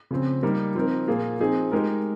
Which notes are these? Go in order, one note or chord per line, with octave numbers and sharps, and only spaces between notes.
C#3 F3 C4
G3 A#3 D#4 A#4
F3 C4 D#4 A#4
A#2 F3 A#3 F4 G#4
F3 C4 D#4 G#4
G#3 D#4 G4 A#4